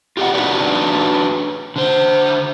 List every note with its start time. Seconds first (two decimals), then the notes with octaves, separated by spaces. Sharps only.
0.17 F4 G4 D5 D#5 F#5
0.34 D4 D#4 F#4 B4 C#5 D5
1.76 D3 C5